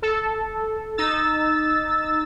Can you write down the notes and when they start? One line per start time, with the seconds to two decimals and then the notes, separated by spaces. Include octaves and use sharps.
0.02 A4
0.98 D#4 E6 A6